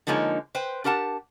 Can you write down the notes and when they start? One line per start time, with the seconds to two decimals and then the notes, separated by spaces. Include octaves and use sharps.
0.07 D3 F3 G#3 A#3 D#4 C#5
0.55 B4 C5 G5
0.84 D4 G4 A#4 F#5 A5